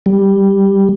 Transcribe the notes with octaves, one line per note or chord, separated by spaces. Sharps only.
G3